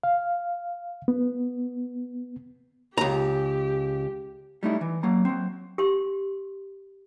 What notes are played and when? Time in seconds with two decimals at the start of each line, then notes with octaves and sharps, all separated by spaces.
0.04 F5
1.08 B3
2.98 C#2 G4 A#5
4.63 G3 A3 D#4 E4
4.81 E3
5.03 F#3 A#3 A#5
5.25 F#3 C4
5.78 G4 C6